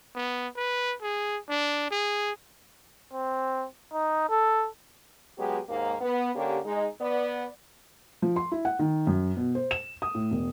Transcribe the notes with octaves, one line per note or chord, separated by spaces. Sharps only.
B3
B4
G#4
D4
G#4
C4
D#4
A4
F#3 G#3 B3 G4
D#2 G#2 A#3
B3
D3 A#3 C#4 G4
G#3 D#4
B3 D5
F3
C6
E4
F#5
D#3
F#2
B2
C5
E7
D#6
A2
E1